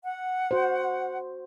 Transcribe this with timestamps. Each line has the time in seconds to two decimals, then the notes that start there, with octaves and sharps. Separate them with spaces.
0.04 F#5
0.51 F#4 C5